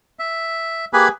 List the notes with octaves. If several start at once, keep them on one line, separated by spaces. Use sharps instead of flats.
E5
A#3 G4 G#4 B4 G#5 B5